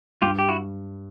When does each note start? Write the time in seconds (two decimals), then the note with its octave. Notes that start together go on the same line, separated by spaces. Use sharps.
0.22 G2 F4 G4
0.39 G4
0.48 E4 F#4